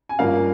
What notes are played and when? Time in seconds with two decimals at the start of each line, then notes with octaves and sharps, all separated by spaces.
0.09 G#5
0.19 G2 F3 A#3 C#4 F5